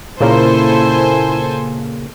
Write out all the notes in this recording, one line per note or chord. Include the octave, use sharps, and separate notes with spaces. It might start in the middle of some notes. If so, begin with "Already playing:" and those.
A#2 C#3 A#3 E4 A4 C5 G#5